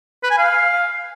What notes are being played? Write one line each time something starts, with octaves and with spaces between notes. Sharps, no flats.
B4
G#5
F5